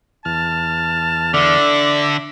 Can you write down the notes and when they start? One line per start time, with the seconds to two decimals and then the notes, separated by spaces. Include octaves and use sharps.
0.25 E2 A5 F6
1.34 D3 D5 E5